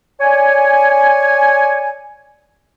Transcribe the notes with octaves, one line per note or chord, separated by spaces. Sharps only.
C#5 D5 G#5